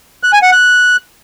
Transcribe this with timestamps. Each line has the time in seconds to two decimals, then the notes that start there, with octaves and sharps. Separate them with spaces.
0.23 F#6
0.33 G#5
0.42 F#5
0.52 F#6